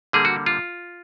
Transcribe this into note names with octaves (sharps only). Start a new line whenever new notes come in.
D3 G3 A#3 G#4
F#4
F4